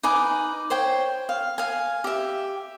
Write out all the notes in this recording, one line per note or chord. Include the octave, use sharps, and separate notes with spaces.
D#4 B4 G#5 D6
C5 C#5 G5
F5
F5 G#5
G4 E5